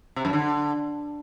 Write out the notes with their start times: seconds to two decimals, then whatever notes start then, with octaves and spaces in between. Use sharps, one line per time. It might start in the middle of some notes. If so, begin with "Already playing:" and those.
0.16 C3
0.25 F#2
0.33 D3